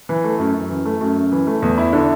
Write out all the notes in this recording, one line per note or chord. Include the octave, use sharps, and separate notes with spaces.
E3
A3
F#2
F#2
E3
A3
F#2
F#2
E3
A3
E2
E4
D3